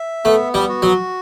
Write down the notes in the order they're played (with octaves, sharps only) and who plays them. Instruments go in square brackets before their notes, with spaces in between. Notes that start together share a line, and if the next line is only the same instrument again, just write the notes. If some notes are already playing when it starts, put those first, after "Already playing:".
Already playing: [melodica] E5
[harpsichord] A3 [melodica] B3
[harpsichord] G3
[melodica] F#4
[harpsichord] F#3